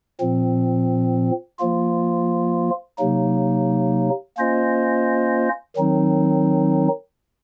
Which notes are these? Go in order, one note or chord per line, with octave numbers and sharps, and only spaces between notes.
A#2 F3 C4
F3 A#3 F4
C3 F#3 A#3 D#4
A#3 C#4 F4 C5 D#5
D#3 F#3 C4 D#4